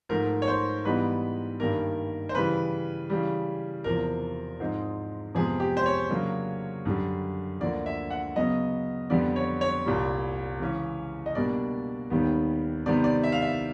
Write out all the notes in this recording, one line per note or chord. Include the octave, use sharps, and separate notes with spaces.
G#2 F3 A3 A#4
C#5
C5
G#2 E3 G3 B3 D#4 B4
G2 D#3 G3 A#3 A#4
C5
C#3 E3 G3 B4
C#3 E3 G3
E2 C3 F3 A#4
G#2 F3 G#3 C4 D#4
F2 C3 F3 G#3 B3 G#4
G4
C5
C#5
C#3 F#3 A#3 D4
F#2 D3 G3
D2 D3 F3 A#3 D5
E5
F#5
C#3 F#3 B3 D#5
F2 D3 G3 B3 D5
C#5
C#5
C2 A#2 G3
C#3 E3 G#3 C#4
D#5
B2 G3 A#3 D4 D5
D#2 D#3 G3 B3
C3 D#3 G3 B3 D5
D5
E5
F5
E5